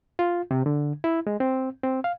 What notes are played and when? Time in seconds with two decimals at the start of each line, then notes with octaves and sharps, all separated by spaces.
0.19 F4
0.51 C3
0.66 D3
1.04 E4
1.27 G#3
1.40 C4
1.83 C4
2.04 F5